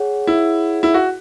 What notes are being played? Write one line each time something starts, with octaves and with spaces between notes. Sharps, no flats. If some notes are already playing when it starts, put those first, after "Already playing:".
Already playing: G#4 C#5 F#5
E4
E4
F#4